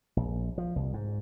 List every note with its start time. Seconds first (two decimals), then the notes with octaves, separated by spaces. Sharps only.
0.17 A#1
0.58 F3
0.76 C2
0.94 G#2